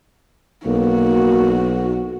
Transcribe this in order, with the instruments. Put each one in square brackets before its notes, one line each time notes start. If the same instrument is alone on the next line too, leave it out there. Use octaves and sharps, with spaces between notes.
[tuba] B1 [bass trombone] A#3 [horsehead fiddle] F#4